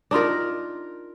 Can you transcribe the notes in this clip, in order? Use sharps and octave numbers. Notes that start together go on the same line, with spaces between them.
D4 D#4 F4 A#4